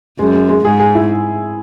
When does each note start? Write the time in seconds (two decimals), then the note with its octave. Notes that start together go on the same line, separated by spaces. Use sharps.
0.19 F#2 G#3
0.34 G#3
0.49 G#3
0.65 G#2 G#4
0.79 G#4
0.95 E4